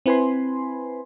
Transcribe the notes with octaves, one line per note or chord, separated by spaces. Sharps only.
C4 E4 B4 G#5 B5 C6